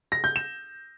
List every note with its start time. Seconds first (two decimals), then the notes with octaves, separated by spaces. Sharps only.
0.12 A#6
0.24 G6
0.36 E7